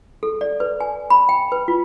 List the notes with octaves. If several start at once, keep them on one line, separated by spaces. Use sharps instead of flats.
A4
D5
B4
G#5
B5
G5
B4
F4